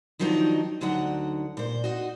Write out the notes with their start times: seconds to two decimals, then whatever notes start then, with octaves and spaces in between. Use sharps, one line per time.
0.19 D#3 F3 F#3 D4 D#4 F4
0.81 D2 D3 F#3 D#4 F#5
1.57 A#2 C5
1.84 D#4 F#4